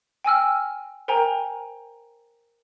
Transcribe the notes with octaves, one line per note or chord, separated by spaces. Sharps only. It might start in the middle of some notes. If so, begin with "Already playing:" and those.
G5 G#5 E6 F6
A#4 C5 G5 G#5 A#5